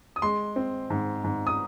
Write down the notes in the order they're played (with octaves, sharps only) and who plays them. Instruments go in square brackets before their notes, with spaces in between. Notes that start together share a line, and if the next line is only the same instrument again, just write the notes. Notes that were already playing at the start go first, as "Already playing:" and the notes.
[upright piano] D#6
G#3 C6
C4
G#2
G#2
D#6